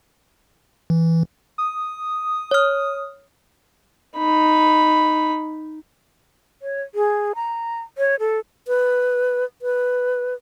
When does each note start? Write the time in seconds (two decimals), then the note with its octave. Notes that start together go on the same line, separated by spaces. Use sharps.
0.90 E3
1.58 D#6
2.51 C#5 F6
4.18 D#4 B5
6.62 C#5
6.95 G#4
7.35 A#5
7.98 C#5
8.20 A4
8.68 B4
9.62 B4